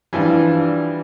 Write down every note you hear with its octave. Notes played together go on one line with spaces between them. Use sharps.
E3 F3 G3 D4